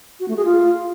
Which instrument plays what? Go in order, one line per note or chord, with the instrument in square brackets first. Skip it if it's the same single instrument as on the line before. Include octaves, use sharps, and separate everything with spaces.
[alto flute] F#4
A3
G#4
F4